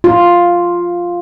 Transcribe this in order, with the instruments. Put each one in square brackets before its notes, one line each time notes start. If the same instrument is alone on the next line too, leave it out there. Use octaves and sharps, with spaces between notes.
[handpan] F4